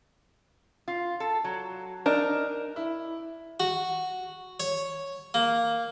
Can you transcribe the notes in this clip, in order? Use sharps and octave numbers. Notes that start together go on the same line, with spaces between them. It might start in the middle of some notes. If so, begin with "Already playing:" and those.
F4
A4
F#3
D4 D#4 A#4
E4
F#4
C#5
A#3